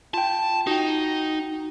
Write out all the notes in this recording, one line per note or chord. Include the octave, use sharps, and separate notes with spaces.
F4 G5 A5
D#4 F#4 G5